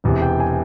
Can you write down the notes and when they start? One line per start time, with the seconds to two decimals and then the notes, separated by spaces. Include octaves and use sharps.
0.04 E1 E2 C3
0.22 G5
0.40 G#5